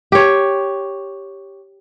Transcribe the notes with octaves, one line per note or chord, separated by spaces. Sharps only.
G4 C#5